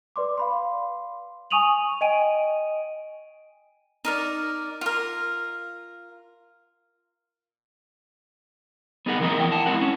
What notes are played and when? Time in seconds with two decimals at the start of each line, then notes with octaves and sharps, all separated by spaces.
0.16 B4 D5 C6 D6
0.38 F5 B5 C6
1.50 G#5 C#6 D#6 D#7 F7 F#7
2.01 D#5 G5 G#5 D7 D#7
4.05 D#4 A#4 D5
4.81 F4 A#4
9.06 B3 D#4 G#4 A#4 B4 F#5
9.20 E3 F3 A#3 C4 A#4 D#5
9.39 E2 G2 E4 G5
9.52 F#5 A5
9.66 G#3 C4 E4 A#4 F#5
9.81 C#4 C#5